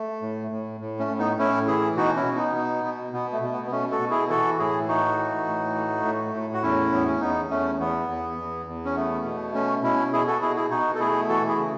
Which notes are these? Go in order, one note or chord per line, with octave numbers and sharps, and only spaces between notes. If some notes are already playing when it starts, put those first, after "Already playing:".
Already playing: A3
A2
A2
A2
A3 C#4
A2
B3 D#4
A2 C#4 E4
E3 E4 G#4
B2 D#4 F#4
C#4 E4
B2
B3 D#4
B2
B2
B2 B3
A3
B2
B3
B3
B2 A3 C#4
F#4 A4
B2
E4 G#4
E3 F#4 A4
A2 E4 G#4
A3 D#4 F#4
E3
A2
A3
A2
A2
F#4
E2 C#4 E4
E2 B3
C#4
E2 B3 D#4
E2 A3 C#4
E2 B3
E2
E2
E2
C#4
A3 B3
B2
A3 C#4
B2 C#4 E4
B2 E4 G#4
F#4 A4
B2 E4 G#4
E4 G#4
B2 D#4 F#4
A4
A3 E4 G#4
E3 F#4 A4
E4 G#4
C#3